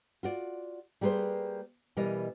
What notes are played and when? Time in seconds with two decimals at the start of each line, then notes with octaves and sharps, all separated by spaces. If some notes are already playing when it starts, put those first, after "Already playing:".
0.23 F4 F#4 D5
1.01 G3 A#3 G#4 B4 C5
1.97 B2 E3 G3 A#4 D#5